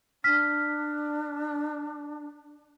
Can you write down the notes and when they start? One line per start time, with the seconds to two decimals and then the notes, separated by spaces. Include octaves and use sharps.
0.24 D4 F6 B6